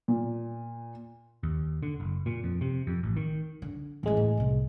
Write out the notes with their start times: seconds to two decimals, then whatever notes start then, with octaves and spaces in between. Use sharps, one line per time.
0.08 A#2
1.43 D#2
1.83 D3
2.00 F#1
2.26 A#2
2.44 F2
2.61 C3
2.87 F2
3.03 A1
3.16 D#3
3.62 D3
4.03 A1 D#3 E3 G#3
4.17 A2
4.37 C2 C3